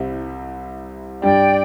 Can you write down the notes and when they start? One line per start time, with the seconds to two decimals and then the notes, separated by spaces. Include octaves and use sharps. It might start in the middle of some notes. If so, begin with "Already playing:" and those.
Already playing: C2 C3 G3 E4
1.22 G2 G3 D4 D5 G5